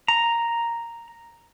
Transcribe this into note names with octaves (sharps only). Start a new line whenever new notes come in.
A#5